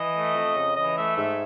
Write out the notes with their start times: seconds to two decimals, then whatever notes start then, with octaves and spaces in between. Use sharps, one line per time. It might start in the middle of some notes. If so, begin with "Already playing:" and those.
Already playing: E3 D#5
0.14 A3
0.34 F2
0.55 C#3
0.76 E3 D#5
0.96 A3 E5
1.17 G#2 E5